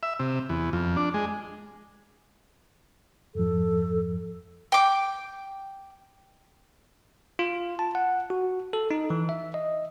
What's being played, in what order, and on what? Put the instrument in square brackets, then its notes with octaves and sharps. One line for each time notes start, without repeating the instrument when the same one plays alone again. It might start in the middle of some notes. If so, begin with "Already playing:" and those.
[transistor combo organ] E5
C3
E2
F2
D4
G#3
[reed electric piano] F2 G#2 F3 [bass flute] A4
[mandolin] G5 D6
[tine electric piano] F4
A5
F#5
F#4
A4
D#4
E3
E5
D#5